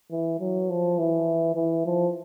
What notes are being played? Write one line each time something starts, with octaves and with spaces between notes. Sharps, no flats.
E3
F#3
F3
E3
E3
F3